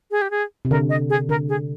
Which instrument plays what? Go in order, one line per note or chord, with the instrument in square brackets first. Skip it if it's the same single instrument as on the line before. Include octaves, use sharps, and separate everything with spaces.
[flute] G#4
G4
G#4
[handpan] C3
[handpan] D3 [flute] A#4
[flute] D#5
G#4
[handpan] D3 [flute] A#4
[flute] G#4